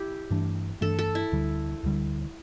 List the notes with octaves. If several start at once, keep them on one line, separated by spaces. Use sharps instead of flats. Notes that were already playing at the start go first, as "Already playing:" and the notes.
Already playing: E4 G4
G2 E3 A3 D4
G2 E3 A3 D4 A4
A4
E4
D2 D3 G3
D2 D3 G3